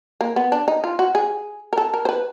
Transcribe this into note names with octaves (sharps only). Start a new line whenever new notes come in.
A#3
B3
D4
D#4
F4
F#4
G#4
A#4
A4
A#4
C5
B4